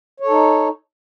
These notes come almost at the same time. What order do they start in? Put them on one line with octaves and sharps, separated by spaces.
C#5 A4 D#4